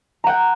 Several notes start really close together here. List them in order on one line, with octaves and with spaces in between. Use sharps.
A#5 F#5 G5